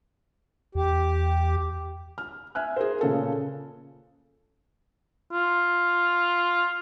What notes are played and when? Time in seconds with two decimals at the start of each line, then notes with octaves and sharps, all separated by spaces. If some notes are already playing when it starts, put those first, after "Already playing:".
0.75 E2 G4
2.18 F6
2.55 E5 G#5 F6 F#6
2.76 G#4 A#4 C5
3.01 A#2 C#3 A4
5.32 F4